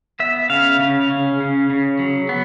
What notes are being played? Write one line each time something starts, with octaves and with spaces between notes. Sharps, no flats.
B3 E5
C#3 F5
C#3
C#4
C#3
C#3
F#3
B3